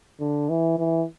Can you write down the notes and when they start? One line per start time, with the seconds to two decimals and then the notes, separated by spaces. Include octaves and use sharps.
0.21 D3
0.49 E3
0.79 E3